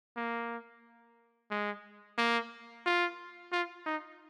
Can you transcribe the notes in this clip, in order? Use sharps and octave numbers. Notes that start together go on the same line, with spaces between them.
A#3
G#3
A#3
F4
F4
D#4